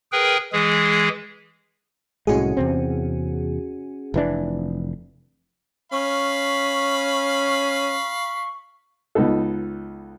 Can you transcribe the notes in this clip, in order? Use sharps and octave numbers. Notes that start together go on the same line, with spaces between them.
G#4 A#4 B4 G5
E3 G#3 G#4
C2 A2 G#3 C#4 F#4 G#4
E2 C3 C4
F1 E3 D4
C#4 F5 B5 C#6
C#2 B3 D#4 A4